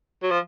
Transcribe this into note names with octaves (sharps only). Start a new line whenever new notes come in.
F#3
F3